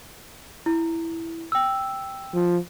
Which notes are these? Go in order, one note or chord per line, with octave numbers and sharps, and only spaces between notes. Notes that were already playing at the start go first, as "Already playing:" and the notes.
E4
G5 E6
F3